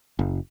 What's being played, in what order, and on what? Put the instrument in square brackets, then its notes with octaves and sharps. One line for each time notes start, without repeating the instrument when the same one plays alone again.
[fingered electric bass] F#1